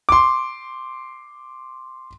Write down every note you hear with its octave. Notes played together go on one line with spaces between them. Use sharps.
C6 D6